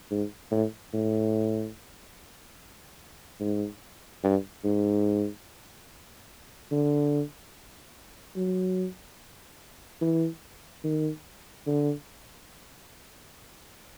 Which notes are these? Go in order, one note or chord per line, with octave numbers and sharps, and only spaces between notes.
G#2
A2
A2
G#2
G2
G#2
D3
F#3
E3
D#3
D3